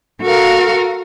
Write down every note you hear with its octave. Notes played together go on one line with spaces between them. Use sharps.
F#4 A4 A#4 F5